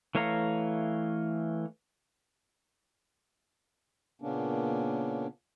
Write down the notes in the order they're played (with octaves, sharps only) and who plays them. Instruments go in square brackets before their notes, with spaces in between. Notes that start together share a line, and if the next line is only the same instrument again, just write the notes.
[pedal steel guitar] E3 A3 C#5 F5 A#5
[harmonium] A#2 C#3 A#3 B3 C#4 D4